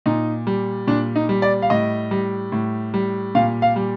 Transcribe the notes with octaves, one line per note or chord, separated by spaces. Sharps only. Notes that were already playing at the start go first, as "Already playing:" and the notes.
A#2 D#4
G3
A#2 D4
D#4
G3
D5
F5
A2 D#5
G3
A2
G3
A#2 F5
F5
G3